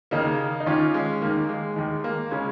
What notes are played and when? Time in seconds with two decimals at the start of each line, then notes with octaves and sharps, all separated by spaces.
0.11 D#2 C#3 A#3 D#4
0.60 D#4
0.66 D#2 D#3 C#4 F4
0.94 G#3 C#4
1.22 D#2 D#3 A#3
1.49 G#3
1.76 D#2 D#3 G#3
2.04 A#3
2.31 C#3 G#3 C#4